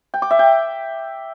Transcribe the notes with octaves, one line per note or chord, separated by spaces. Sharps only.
G5
D6
E5
G5